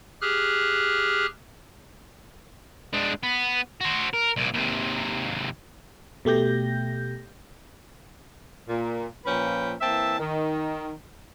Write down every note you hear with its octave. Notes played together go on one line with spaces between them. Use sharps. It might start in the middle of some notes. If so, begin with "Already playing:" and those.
G4 G#4 F6 F#6
G#3 D4
B3
F#4 C5
A#4
C2 A#2
D#2 C3
B2 A3 G4 G6 A#6
A#2
A#2 F3 C#4 B4 G5
E3 A#3 C4 E5 A5
D#3